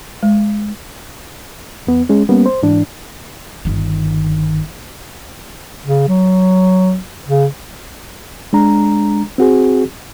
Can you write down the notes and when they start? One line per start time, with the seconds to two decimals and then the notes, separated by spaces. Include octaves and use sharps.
0.23 G#3
1.87 E2 B3
2.09 G#3 C#4
2.29 G3 A#3 B3 C#4
2.46 C5
2.63 G#2 E3 D4
3.65 G1 D#3
5.86 C#3
6.08 F#3
7.28 C#3
8.53 G#3 D4 A#5
9.38 C4 F#4 G#4